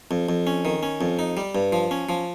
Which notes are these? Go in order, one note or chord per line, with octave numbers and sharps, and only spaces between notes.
F2
F2
C#4
D#3
C#4
F2
D#4
G3
G2
F3
C#4
F3